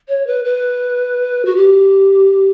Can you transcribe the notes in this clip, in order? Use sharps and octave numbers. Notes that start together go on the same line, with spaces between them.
C#5
B4
B4
F#4
G4